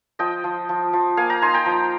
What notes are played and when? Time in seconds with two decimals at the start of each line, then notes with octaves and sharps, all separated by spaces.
0.19 F3 D#5 G5
0.44 F3
0.69 F3
0.93 F3
1.17 A#3 F5 G#5
1.30 G5 A#5
1.42 D#4 G#5 C6
1.54 G5 A#5
1.66 F3